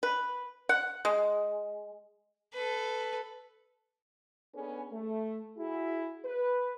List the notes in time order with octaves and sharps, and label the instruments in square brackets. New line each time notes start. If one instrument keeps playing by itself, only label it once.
[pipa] B4
F#5
G#3
[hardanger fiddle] A4 B4
[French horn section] B3 C#4 D4 G#4 A4 B4
A3
E4 F#4 G#4
B4